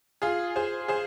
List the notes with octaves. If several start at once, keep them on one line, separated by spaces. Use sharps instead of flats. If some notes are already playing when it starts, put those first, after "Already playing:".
F4 G#4
G#4 C5
G#4 C5